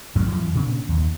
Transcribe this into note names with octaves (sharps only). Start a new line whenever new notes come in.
A1 F2 G#2 F#3
F2 E3 F#3
A#2 C#3 C4 D4
D#2